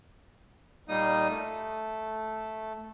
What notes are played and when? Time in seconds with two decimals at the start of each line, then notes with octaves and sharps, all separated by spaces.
0.89 A#2 G3 A#3 D#4 D#6
1.28 A3